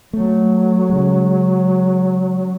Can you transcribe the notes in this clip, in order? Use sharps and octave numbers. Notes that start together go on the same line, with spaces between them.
F#3 A3
C#3 G#3